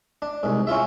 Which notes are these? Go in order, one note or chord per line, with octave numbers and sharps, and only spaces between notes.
D4
C2 G#2
C#4 E4 F4 E5